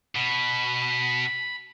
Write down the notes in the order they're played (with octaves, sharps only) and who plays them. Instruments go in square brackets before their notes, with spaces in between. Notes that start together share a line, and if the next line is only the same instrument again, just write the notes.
[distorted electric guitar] B2 [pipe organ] B5